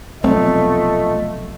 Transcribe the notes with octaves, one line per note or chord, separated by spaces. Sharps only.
F1 B1 A3 C4 F4 D#5